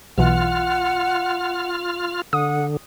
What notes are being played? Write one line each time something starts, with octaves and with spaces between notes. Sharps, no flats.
B1 B2 E3 F4 F#5 F6
D3 F#5 D#6